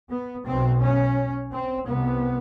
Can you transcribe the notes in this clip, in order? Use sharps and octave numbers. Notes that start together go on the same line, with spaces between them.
B3
B1 B2 C4
C#4
C4
C2 C3 B3